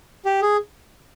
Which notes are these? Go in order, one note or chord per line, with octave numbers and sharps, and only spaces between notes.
G4
G#4